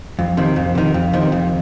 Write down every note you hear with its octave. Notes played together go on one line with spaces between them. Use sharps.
F2
C3 D#3
F2
C3 D#3
F2
C3 D#3
F2